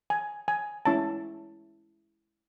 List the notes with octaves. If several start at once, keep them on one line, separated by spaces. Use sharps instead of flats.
G#5
G#5
G#3 C#4 E4 A5